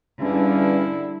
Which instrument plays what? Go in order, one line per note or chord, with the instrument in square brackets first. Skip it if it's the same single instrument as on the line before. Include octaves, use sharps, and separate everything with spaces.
[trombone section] E2 G2 [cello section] D3 G3 [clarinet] C#4 [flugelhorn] E4